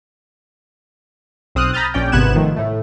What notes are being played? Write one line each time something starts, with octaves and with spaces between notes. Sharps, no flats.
B1 C4 D#6 F6 F#6
A#5 B5 D#6 F6 G6 A6
A#1 C#4 D5 G5 G6
G#1 C3 B3 F#6 G#6 E7
D#3 F3 A3
A2 A3